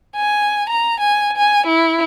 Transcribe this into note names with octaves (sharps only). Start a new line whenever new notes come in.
G#5
A#5
G#5
G#5
E4